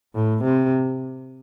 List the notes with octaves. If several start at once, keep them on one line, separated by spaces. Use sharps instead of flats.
A2
C3